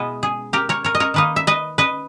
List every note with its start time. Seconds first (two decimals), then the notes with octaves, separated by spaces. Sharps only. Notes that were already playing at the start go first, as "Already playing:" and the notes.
Already playing: B2 G#3 B3 E4 B4 D#5
0.23 G#4
0.53 G4 A#4
0.69 A#4 C#5
0.84 A#4 C#5
0.95 D#5
1.00 A#4 C#5
1.14 D#3 A#3 D#4 B4 D#5
1.36 E5
1.47 B4 D#5
1.78 B4 D#5